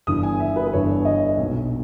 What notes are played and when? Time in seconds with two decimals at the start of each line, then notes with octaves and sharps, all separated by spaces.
0.07 G1 G2 E3 D#6
0.23 G#5
0.40 E5
0.56 B4
0.67 B4
0.73 G1 G2 E3 C#5
1.05 D#5
1.38 B1 A#2